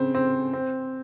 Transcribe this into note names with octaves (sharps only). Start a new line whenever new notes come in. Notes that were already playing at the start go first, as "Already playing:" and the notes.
Already playing: C#3 C4
C4
C4